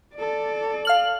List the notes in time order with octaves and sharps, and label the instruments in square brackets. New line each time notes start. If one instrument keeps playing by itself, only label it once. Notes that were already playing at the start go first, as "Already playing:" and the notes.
[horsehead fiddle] A4 D5
[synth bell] F5 F6 F#7